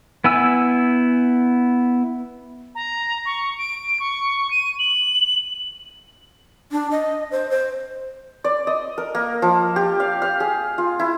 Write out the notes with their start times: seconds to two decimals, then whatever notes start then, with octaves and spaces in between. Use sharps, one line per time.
0.24 B3 E4 G#5 E6
2.75 A#5
3.25 C#6
3.58 D7
4.00 C#6
4.51 D#7
4.79 F#7
6.72 D4
6.91 D#5
7.31 C5
7.50 C5
8.44 D5
8.67 D#5
8.98 A#4
9.15 A#3
9.42 F3
9.76 G4
10.00 F5
10.22 F5
10.40 G#4
10.78 F4
10.99 E4